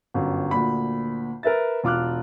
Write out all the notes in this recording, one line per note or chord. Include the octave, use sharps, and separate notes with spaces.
G1 F#2
D2 A#2 B5
A#4 B4 E5 A6
E1 F4 D6 F6 F#6